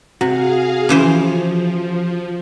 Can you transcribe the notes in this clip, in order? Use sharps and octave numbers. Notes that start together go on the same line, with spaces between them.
C3 F#4 G#4 F5
C#3 E3 F3 C5